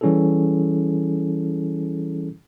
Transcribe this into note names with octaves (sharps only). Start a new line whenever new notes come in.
E3 G3 C#4 E4 G#4 A4